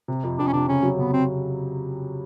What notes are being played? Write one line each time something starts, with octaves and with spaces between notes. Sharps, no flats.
C3
F2
F2 D4
C#4
C3 D4
C#3 C#4
F#3
C#3 B3
C4